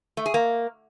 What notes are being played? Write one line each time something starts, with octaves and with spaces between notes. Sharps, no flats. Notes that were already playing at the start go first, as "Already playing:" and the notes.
A3
G#4
A#3